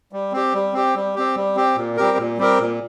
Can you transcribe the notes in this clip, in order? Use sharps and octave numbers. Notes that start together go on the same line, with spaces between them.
G3
C4 G4
G3
C4 G4
G3
C4 G4
G3
C4 G4
A#2
G3 C4 G4 A#4
A#2
G3 C4 G4 A#4
A#2